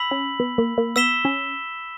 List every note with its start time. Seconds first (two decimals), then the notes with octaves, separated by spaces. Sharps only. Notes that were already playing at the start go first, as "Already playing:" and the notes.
Already playing: B5 E6 B6 F#7
0.11 C#4
0.40 B3
0.58 A#3
0.78 A#3
0.96 B3 E6 B6 E7 G7
1.25 C#4